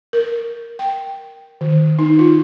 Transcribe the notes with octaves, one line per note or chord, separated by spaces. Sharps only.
A#4
G5
D#3
D#4
F4